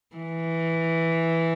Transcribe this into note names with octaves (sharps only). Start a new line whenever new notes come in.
E3